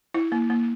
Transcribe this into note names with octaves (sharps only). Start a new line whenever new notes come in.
E4
A#3
A#3